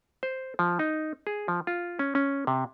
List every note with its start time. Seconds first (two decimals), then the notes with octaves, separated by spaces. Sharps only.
0.23 C5
0.59 F3
0.79 D#4
1.27 G#4
1.48 F3
1.67 F4
1.99 C#4
2.15 C#4
2.47 C3